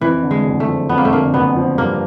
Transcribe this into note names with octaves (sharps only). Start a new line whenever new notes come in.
F2 E3
D3
G#3
F#1
A3
F3
F2 B3
A#3
A3
D3 A#3
F#1 B3
F3
G2 A#3